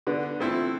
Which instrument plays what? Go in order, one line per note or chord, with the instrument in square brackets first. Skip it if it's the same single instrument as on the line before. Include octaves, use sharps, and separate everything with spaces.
[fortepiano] D3 [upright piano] B3 D4
[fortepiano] A3 C4 E4 A4